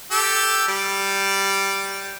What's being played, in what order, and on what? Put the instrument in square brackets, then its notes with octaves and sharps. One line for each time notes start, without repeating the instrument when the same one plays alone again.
[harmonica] G4 A4 E6
G3